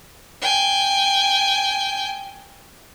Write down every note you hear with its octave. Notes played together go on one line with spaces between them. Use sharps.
G5 G#5